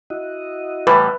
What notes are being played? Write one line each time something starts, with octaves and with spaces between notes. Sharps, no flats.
E4 F#4 D#5
A2 E3 G3 B4